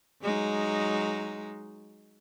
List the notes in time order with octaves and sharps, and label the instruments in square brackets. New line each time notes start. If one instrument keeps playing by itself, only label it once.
[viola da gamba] F#3 G#3 D#4